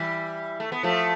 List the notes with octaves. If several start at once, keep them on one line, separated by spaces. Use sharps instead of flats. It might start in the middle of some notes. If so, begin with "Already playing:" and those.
Already playing: E3 G3
A3
B3
F3 A3